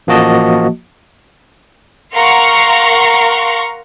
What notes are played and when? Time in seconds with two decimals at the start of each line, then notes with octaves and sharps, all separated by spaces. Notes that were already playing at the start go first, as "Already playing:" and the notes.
0.07 A1 F3 A#3 F#4 D#5 A5
2.15 A#4 F5 F#5 A#5 C6 C#6